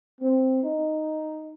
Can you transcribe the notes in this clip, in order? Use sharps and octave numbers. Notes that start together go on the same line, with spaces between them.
C4
D#4